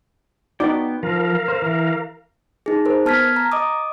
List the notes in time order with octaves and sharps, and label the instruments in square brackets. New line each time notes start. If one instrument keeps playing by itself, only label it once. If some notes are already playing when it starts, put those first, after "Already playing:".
[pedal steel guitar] B3 G5 [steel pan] D#4 F#4 D5
[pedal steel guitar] F3 [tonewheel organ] A#4 F5
[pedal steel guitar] C5
E3
[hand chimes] D#4 G#4
A#4 C5
B3 A5 F6 G#6 B6
A#5
D#5 D6 D#6